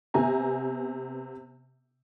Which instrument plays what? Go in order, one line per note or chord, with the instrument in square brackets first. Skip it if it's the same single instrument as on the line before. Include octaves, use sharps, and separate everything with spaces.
[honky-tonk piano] C3 B3 G#5 A#5